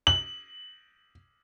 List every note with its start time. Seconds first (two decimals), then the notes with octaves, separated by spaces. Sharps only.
0.07 F#7